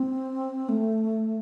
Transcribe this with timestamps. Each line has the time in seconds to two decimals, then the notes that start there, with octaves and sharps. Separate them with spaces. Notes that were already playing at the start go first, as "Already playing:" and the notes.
Already playing: C4
0.69 A3